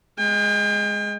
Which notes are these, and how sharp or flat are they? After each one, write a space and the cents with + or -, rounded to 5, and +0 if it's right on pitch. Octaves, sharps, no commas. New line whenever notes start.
G#3 +0 G5 +40